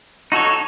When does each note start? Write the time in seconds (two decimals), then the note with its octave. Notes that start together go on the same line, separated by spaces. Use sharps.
0.32 D#4 F#4 A4 C#5